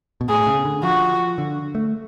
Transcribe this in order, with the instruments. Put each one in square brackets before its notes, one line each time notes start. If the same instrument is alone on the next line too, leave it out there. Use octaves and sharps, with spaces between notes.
[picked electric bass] B2
[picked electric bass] A2 [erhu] G#4
[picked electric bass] C#3
D3
[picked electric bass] F3 [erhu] F#4
[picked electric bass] D3
A3